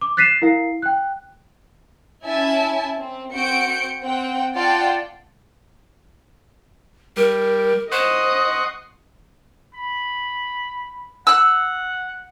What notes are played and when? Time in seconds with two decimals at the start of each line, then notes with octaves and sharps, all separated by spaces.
0.01 D6
0.17 F#6 A6 B6 C7 D#7 E7
0.42 E4 A#4 F5 C7
0.82 G5 F#6
2.25 C#4 E4 E5 G#5 A5
2.99 C4
3.33 C4 F#4 G6 C#7 D7
4.03 C4 F#5 G5
4.56 F4 D5 F#5 G5 A5 C6
7.17 G3 A#4
7.92 C5 D#5 F#5 C6 C#6 D#6
9.74 B5
11.27 F#5 E6 F#6